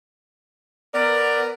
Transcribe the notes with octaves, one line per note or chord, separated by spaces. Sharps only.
B3 A#4 D5